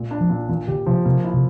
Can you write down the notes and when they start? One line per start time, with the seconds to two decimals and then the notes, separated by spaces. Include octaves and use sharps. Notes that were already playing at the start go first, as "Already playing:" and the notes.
Already playing: A#2
0.11 D4
0.21 F3
0.30 A#2
0.49 A#2 E3
0.67 D3 G4
0.86 C3 F3
1.05 C3 A#3
1.24 E4
1.34 C3